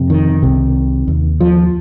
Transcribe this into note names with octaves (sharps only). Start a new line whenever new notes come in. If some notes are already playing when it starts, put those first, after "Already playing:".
Already playing: F2 C3
D#3
C2 C3
D#2
F3